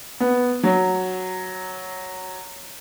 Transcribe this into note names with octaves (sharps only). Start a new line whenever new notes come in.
B3
F#3